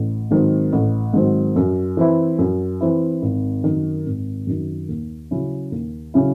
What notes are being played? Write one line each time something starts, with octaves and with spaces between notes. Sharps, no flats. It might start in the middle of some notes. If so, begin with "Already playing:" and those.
Already playing: A1
G#2 D#3 F#3 C4
A1
G#2 D#3 F#3 C4
F#2
E3 C4 E4
F#2
E3 C4 E4
G#1
F#2 D#3
G#1
F#2 D#3
D#2
C#3 F#3 C#4 E4
D#2
C#3 F#3 C#4 E4